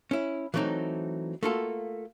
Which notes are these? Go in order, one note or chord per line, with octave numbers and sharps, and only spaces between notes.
C#4 E4
E3 F#3 A3 C4 D#4
A3 A#3 F4 F#4 A4